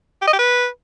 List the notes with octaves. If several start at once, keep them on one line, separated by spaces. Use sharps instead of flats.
G4
D#5
G4
B4